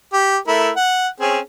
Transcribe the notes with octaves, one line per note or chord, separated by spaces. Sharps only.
G4
A3 E4 A#4
F#5
C4 C#4 G#4